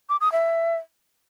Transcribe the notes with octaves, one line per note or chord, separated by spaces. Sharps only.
D6
D#6
E5